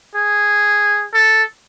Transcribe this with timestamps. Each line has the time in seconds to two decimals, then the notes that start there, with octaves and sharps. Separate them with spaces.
0.15 G#4
1.13 A4